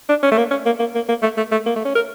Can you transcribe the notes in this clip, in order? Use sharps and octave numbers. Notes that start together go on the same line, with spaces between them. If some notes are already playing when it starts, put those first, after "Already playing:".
D4
C#4
A3
A#3
C#4
A#3
A#3
A#3
A#3
A3
A3
A3
A#3
A3
C#4
A#4